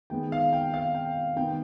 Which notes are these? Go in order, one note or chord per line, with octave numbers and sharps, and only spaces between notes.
D#3 G#3 B3 G5
F5
G5
F5
G5
D#3 B3 G5